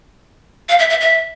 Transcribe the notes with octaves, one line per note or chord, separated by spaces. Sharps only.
F5
E5
E5
E5